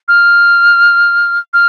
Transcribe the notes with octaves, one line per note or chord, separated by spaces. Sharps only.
F6
F6